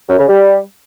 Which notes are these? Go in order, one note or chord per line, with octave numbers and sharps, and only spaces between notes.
F#2
C#3
G3